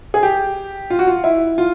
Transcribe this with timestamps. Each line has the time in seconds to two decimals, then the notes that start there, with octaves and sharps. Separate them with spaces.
0.14 G#4
0.23 G4
0.90 F4
0.99 F#4
1.07 F4
1.24 E4
1.58 F4